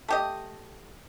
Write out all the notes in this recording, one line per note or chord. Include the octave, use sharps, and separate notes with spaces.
A3 G4 D#5